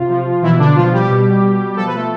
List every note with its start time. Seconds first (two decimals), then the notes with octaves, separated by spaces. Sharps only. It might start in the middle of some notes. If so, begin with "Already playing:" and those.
Already playing: C3 F4
0.09 F3
0.42 B2 E3 E4
0.59 D3 D4
0.75 B2 F3 F4
0.93 G3 G4
1.09 B2
1.43 B2
1.76 F3 A4
1.86 B4
1.95 A3 A4